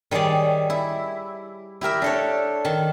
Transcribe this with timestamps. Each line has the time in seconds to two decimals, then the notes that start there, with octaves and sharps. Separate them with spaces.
0.11 D#3 G3 G#4 C#5 D5
0.70 E4
1.81 E4 G4 A#4 E5
2.02 D4 A4 C#5
2.64 D#3 A5